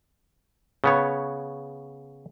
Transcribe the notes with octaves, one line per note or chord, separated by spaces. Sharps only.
C#3 B3 C#5